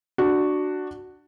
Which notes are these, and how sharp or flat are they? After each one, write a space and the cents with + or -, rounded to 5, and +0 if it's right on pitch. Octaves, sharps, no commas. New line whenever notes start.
D4 +10 F#4 +0